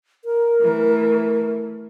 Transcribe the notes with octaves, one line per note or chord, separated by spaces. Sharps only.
A#4
E3 A3